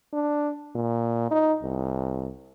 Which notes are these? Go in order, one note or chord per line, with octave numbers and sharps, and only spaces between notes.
D4
A#2
D#4
C2